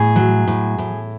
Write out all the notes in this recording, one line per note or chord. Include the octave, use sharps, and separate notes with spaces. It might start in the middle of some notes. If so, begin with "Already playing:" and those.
Already playing: A2 G#4
F#3
A2
A2